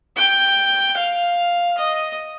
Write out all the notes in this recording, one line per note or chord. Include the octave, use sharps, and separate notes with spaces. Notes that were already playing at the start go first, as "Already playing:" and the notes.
G5
F5
D#5